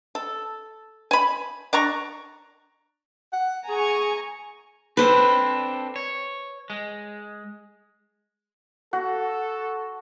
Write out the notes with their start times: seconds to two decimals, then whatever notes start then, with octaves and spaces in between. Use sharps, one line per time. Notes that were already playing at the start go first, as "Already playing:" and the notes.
0.15 A4
1.11 G#5 B5
1.73 D4 D5 A#5 C#6
3.33 F#5
3.69 G#4 G#5 A#5 C#6
4.97 C4 D4 A4 B4 C5
5.96 C#5
6.70 G#3
8.93 F#4 A4 F#5